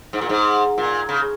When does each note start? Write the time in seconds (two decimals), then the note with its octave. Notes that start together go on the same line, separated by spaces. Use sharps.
0.13 G#2
0.21 A#2
0.29 G#2
0.78 A#2
1.09 C#3